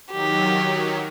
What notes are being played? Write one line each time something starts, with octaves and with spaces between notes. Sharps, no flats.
D#3 F#3 G4